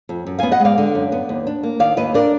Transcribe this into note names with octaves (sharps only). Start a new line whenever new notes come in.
F2
F#2
B3 F5 G#5
D#5 F#5
G#3 D5 F5
D3
F#2
B3
D#2
D4
A#3
D#3 D5 F5
D#2 B4 D#5
D4 A#4 D5